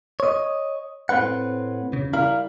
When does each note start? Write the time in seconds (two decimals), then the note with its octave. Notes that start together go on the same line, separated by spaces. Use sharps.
0.20 C#5 D#5
1.09 A2 C4 C#4 B4 F#5
1.93 C#3
2.13 G3 E4 A#4 F5